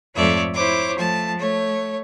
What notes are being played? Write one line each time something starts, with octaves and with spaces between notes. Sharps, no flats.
F2 G#2 A3 C#5 D5 E5
E4 C5 C#5 D6
F3 A3 A5
A3 C#5